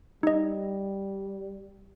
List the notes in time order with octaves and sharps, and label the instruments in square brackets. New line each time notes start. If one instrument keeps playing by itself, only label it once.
[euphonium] G3 [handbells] D#4 D#5